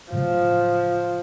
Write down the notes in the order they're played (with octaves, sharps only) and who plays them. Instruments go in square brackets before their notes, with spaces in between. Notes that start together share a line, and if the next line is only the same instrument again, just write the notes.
[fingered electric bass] A2 C#3 F#3 [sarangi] F3